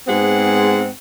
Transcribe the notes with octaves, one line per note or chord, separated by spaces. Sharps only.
G#2 G#3 B3 C4 G#4 F#5